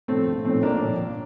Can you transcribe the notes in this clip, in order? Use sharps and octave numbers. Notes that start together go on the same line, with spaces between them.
A2 F3 A3 C4
A#1
A2 F3 A3 C4
A#1 A#3 D4
A2 F3
A#1